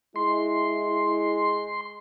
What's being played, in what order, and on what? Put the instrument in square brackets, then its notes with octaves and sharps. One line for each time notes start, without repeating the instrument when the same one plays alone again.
[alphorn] G#3 [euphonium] E4 [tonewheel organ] C6